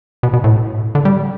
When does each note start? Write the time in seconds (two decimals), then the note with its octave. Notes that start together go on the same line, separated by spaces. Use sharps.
0.23 B2
0.33 B2
0.44 A2
0.95 D3
1.05 G3